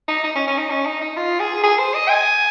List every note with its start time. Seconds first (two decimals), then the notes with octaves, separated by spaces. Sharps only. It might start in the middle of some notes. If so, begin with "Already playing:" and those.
0.08 D#4
0.24 D#4
0.35 C#4
0.47 C#4
0.58 D#4
0.70 C#4
0.86 D#4
1.01 D#4
1.17 F4
1.40 G#4
1.63 G#4
1.79 C5
1.94 D#5
2.09 G#5